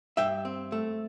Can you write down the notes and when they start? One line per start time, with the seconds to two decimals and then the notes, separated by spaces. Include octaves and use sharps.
0.17 G2 E5 G5
0.45 C4
0.72 A3